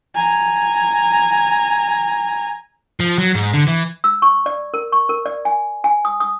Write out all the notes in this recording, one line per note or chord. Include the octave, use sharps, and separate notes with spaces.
G#5 A#5
F3
F#3
G#2
D3
E3
E6
C#6
D5
A#4
C#6
A#4
D5
G#5
G#5
D#6
D#6